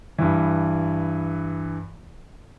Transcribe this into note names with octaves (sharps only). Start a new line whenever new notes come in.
G2 E3